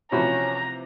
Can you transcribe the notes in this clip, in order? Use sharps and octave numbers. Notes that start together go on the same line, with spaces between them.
C3 E3 F3 A3 C#4 F#4 A#5 B5